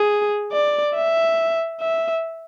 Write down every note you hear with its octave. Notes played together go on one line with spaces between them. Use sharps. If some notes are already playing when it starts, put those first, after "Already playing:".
Already playing: G#4
D5
E5
E5